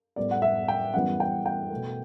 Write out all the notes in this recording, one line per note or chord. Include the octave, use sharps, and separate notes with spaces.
A2 G3 B3 D5
F#5
E5
G5
F#2 E3 G3 B3 F#5
G5
G5
B2 A3